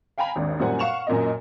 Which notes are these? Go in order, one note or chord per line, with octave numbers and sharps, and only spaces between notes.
F5 G5 G#5 A#5 B5
G#1 D#2 D4
F#2 A#2 G3 C5 F#5 G#5
F5 F#5 C#6 E7 F7
F#2 A#2 A#3 D#5